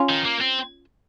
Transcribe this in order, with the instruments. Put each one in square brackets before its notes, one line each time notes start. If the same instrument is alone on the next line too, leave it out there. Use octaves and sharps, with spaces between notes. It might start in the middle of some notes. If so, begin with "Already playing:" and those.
Already playing: [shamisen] C#4 F4
[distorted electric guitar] D#3
A#3
C4